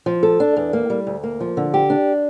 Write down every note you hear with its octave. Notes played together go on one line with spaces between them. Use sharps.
F3
A4
D4
E2
A#3
G3
D2
A#3
F3
D3
G4
D4